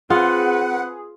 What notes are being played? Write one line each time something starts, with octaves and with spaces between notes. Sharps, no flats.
C4 F4 G#4 B4 F#5